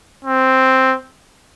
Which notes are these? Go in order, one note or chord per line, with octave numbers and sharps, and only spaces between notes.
C4